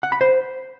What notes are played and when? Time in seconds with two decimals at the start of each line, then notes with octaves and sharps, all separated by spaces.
0.03 F#5
0.12 B5
0.21 C5